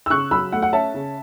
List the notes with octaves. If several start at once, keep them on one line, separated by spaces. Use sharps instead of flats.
E6
C#3 C#6 F#6
F#3 B5 E6
A3 F#5
F#5
C#4 E5 A5
C#3